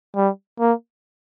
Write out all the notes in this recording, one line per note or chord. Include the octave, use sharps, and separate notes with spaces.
G3
A#3